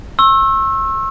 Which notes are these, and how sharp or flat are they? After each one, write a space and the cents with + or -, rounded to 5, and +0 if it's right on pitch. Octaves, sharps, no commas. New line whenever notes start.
C#6 -40 E6 +0